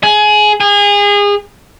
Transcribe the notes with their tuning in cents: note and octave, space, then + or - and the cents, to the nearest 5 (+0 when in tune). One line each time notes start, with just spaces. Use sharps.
G#4 +20
G#4 -30